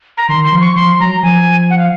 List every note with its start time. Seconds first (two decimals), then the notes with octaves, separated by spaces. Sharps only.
0.17 A#5
0.29 D#3 C6
0.45 C6
0.52 F3
0.61 C#6
0.75 F3 C6
1.00 F#3 A#5
1.23 F3 G#5
1.70 F#5
1.78 F5